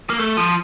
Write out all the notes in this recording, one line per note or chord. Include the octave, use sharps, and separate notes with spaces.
A#3
A3
F3